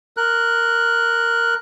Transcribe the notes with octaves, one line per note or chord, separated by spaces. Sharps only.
A#4 F#6